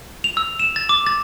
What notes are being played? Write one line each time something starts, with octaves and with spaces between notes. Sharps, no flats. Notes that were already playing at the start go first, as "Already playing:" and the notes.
F7
E6
E7
A6
D6
A6